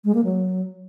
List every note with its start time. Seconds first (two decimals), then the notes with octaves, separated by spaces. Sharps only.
0.05 G#3
0.15 A#3
0.24 F#3